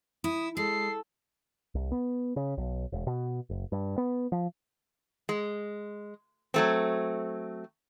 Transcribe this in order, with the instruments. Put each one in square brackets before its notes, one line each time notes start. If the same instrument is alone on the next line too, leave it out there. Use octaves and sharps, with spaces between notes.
[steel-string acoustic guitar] E4 [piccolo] D#6
[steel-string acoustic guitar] G#3 [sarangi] A4 [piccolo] C7
[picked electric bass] C2
B3
C#3
B1
E1
B2
F#1
G2
B3
F3
[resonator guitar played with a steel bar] G#3
F#3 A3 C4